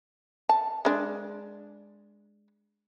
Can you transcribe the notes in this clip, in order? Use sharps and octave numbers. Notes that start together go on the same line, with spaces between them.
A5
G#3 D4